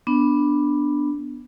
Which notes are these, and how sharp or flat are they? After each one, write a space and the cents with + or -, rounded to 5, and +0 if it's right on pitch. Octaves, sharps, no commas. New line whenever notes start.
B3 +0 D4 +0